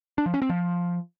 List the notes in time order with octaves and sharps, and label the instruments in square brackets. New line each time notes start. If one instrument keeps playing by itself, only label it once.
[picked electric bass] D4
F3
C#4
C4
F3